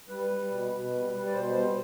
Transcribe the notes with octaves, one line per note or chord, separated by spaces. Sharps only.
G3 B4
G3
B2
B2
G3
G3
D5
B2 C5
G3 C5